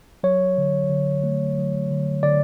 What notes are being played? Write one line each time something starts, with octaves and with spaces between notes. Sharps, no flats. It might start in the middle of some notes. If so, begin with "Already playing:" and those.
F#3 C#5
D3
D3
A3
F#3
D3
D3 D5